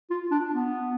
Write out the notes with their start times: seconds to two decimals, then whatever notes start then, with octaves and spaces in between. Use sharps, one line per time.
0.10 F4
0.31 D4
0.53 B3